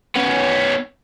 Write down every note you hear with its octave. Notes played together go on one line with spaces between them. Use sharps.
B3 C#4